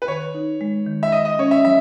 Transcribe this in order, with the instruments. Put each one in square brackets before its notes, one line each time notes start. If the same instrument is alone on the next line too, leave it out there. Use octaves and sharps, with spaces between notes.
[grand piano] B4
[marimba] D#3 [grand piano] C#5
[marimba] D#4
G#3
D#3
[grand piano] E5
[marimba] D#3 [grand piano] D#5
[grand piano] D#5
[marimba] C#4 [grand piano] C#5
[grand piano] E5
[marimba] F#3 [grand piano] E5